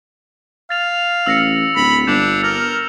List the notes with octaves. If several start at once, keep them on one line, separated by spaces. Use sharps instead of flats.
F5 A6 F7
A1 E6 A#6 C#7
D1 B5 A#6
G1 D4 G6 E7 F7
A#4 F6